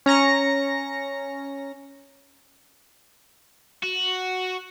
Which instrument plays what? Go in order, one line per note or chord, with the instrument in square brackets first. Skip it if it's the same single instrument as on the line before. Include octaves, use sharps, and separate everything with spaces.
[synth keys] C#4 A#5 A#6 C#7
[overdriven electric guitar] F#4